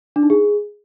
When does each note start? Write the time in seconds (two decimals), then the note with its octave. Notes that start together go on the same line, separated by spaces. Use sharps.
0.16 D4
0.23 D#4
0.30 G#4